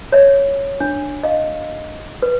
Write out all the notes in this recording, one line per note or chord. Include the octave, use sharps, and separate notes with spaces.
C#5 E5
D4
D#5 F5
B4